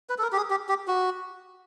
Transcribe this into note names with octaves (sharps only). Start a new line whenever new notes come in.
B4
A4
A#4
G4
G#4
G4
G4
F#4